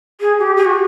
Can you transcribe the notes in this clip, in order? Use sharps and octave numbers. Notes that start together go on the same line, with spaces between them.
G#4
G4
G#4
F#4